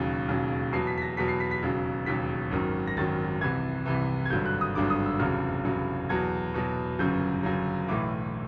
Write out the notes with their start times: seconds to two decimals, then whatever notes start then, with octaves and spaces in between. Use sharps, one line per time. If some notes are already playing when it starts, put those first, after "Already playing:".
Already playing: E1 D#2 C#3 F#3
0.28 E1 D#2 C#3 F#3
0.72 E2 B2 F#3 C7
0.87 B6
0.98 B6
1.02 A#6
1.17 E2 B2 F#3 B6
1.28 C7
1.40 B6
1.51 B6
1.63 E1 D#2 C#3 F#3
2.06 E1 D#2 C#3 F#3 B6
2.51 G#1 F#2 D#3 F#3
2.87 A#6
2.97 G#1 F#2 D#3 F#3 A6
3.41 C2 C3 E3 G#6
3.86 C2 C3 E3
4.25 G#6
4.30 G#1 G2 D3 F#3 G6
4.46 F#6
4.61 D#6
4.75 G#1 G2 D3 F#3 D6
4.90 D#6
5.06 E6
5.19 F1 E2 C#3 F#3 F6
5.65 F1 E2 C#3 F#3
6.09 E2 B2 F#3 G#6
6.54 E2 B2 F#3
6.99 G1 F#2 C#3 F#3 G6
7.43 G1 F#2 C#3 F#3
7.88 B1 A2 E3 D6